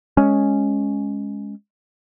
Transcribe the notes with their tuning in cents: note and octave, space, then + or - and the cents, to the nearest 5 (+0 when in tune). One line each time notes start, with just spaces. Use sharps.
G#3 +0 C#4 +0